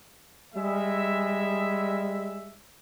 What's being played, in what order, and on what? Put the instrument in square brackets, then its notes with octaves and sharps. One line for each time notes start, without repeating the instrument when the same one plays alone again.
[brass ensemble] G3 G#3 E5